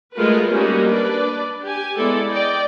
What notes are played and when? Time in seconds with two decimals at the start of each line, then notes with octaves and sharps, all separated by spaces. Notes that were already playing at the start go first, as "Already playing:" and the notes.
0.15 G#3 A3 F4 F#4 A#4 B4
0.48 G3 G#3 A#3 C#4 D#4 F#4
0.86 D4 B4 D5
1.62 G4 G#5
1.96 G#3 B3 E4 A4 D5
2.31 D5 D#5 G5